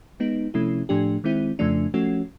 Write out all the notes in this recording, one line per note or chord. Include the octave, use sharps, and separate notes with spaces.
G#3 B3 D#4
C3 F3 A3 C#4 E4
A2 F3 A3 D4 G4
D#3 G#3 C4 E4
F2 C#3 F3 A3 D4
F3 A3 C#4 F#4